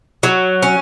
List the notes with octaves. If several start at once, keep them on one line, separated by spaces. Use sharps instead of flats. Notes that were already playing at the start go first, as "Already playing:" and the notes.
F#3
C#4